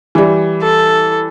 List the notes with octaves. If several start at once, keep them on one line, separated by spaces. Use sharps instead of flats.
E3 G3
A4